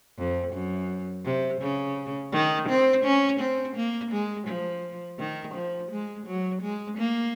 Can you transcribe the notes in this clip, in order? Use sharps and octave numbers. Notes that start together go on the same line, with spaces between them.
F2
F#2
C3
C#3
D#3
C4
C#4
C4
A#3
G#3
F3
D#3
F3
G#3
F#3
G#3
A#3